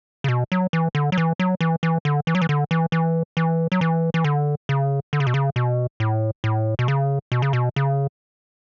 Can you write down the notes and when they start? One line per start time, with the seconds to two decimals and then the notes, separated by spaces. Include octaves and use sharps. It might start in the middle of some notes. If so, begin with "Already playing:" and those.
0.24 C#3
0.28 B2
0.52 F#3
0.73 E3
0.95 D3
1.12 F#3
1.18 E3
1.40 F#3
1.61 E3
1.83 E3
2.05 D3
2.27 E3
2.35 F#3
2.42 E3
2.49 D3
2.71 E3
2.92 E3
3.37 E3
3.72 F#3
3.81 E3
4.14 E3
4.24 D3
4.69 C#3
5.13 D3
5.20 C#3
5.27 B2
5.34 C#3
5.56 B2
6.00 A2
6.44 A2
6.79 B2
6.88 C#3
7.32 B2
7.42 C#3
7.53 B2
7.76 C#3